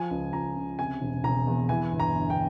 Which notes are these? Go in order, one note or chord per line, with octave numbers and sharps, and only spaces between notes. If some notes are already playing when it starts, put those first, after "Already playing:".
Already playing: F3 G#5
C#2
C#2 A#5
C#3
C3 G#5
E1
E1 A#5
E2
E3 G#5
G1
A#5
G1
G5